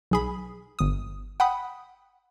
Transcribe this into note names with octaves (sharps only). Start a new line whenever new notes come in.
B1 G#4 B5
G1 D#6
F#5 G5 B5 D#6